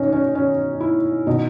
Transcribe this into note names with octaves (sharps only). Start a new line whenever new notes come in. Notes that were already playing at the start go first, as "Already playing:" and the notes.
Already playing: B2 C#4 D#4
C#4
C#4
E4
B2 D#4